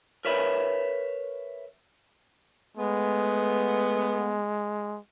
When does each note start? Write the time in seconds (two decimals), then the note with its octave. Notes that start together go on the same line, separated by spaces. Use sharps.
0.25 A#4 B4 C#5 E5 B5
2.77 G#3 A3 B3